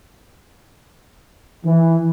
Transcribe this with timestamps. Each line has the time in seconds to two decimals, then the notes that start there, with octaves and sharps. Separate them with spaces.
1.65 E3